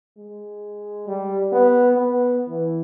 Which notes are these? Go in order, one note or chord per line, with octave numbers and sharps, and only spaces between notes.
G#3
G3
B3
B3
E3